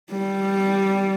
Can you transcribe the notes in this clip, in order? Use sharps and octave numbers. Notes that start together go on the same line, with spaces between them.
G3